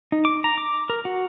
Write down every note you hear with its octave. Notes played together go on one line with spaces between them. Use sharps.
D#4
D6
A#5
D6
A#4
F#4